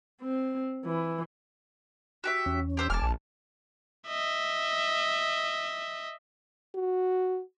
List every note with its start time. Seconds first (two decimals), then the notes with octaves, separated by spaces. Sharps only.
0.21 C4
0.85 E3
2.24 F#4 G4 E5
2.46 E2 C#4
2.77 G4 C5 E5
2.90 E1 G#5 A5 D6 F6
3.02 A#1
4.08 D#5 E5
6.75 F#4